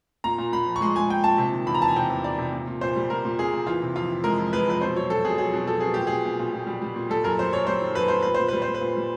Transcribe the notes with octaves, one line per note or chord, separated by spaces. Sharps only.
A#2 A#5
A#2
A#2 B5
F3
C#6
G#3 C6
G#3 G#5
A#2 G5
A#2 A5
C3
D#3
E2 B5
A#5
E2 A5
G#5
C3 G5
E2
D#3 D5
C3
A#2
A#2
A#2 C5
G3
A#2 A#4
A#2
A#2 G#4
A#2
E3 F4
C3
F2 F4
E3
G#3 A#4
F2
G#3 B4
F2 B4
B2 C5
F#3 C#5
B2 A4
B2 G#4
F#3 G#4
B2
F#3 A4
B2 G#4
A#2 G4
A#2 G#4
A#2
A#2
A#2
G3
G3
A#2
G3 A4
F#2 A#4
F#2 C5
F#2 C#5
G3 C5
D#3
F#2 B4
G3 C5
A#2 B4
A#2 C5
G3 B4
C5
G3
B4
A#2
G3